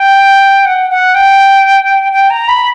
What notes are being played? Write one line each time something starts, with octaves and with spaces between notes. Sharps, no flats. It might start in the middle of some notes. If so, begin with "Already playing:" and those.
Already playing: G5
F#5
F#5
G5
G5
A#5
B5